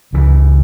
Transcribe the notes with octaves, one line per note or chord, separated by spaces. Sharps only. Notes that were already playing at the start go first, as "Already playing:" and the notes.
C#2 C#3 E3